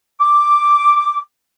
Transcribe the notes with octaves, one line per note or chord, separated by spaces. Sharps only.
D6